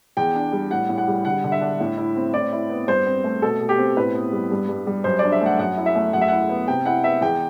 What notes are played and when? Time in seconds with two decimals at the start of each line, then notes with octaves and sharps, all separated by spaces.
0.17 E2 G5
0.35 D4
0.53 G3
0.71 A2 F#5
0.89 A2
0.98 F#5
1.08 G3
1.25 D3 F#5
1.44 D3
1.52 E5
1.61 D4
1.80 A2
1.98 E4
2.16 C4
2.34 A2 D5
2.52 E4
2.70 B3
2.87 G2 C5
3.06 C4
3.24 A3
3.42 B2 A4
3.60 B2
3.69 G4
3.78 C4
3.97 A2 B4
4.15 B3
4.32 G3
4.51 G2
4.68 G2
4.87 G3
5.04 F#2 C5
5.19 D4 D5
5.32 E5
5.41 A3 F#5
5.59 F#2 F#5
5.77 E4
5.86 E5
5.95 A3
6.13 F#2 F#5
6.21 E5
6.28 E4 F#5
6.49 B3
6.68 C3 G5
6.85 E4 F#5
7.04 B3 E5
7.21 E2 G5